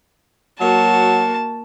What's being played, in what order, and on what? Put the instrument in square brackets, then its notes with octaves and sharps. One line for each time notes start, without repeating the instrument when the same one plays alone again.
[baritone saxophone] F#3 [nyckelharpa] A#3 F#4 [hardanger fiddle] A5